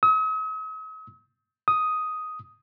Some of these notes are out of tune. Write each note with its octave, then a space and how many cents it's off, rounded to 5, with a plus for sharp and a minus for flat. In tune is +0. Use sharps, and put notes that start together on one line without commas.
D#6 +45
D#6 +5